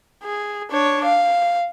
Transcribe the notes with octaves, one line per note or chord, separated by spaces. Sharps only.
G#4
D4 C#5
F5